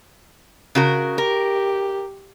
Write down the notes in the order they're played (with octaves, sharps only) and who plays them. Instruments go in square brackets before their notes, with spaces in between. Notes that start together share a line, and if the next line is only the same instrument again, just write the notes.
[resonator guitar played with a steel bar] C#3 F#4 A#4
[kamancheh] G4 [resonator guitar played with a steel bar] A#4